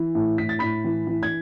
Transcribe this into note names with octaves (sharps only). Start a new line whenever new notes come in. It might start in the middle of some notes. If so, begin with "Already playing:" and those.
Already playing: E3
A2
A2 B6
A6
A2 B5 B6
E3
E3
G#6